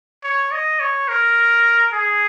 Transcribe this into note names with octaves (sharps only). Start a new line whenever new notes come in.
C#5
D#5
C#5
A#4
G#4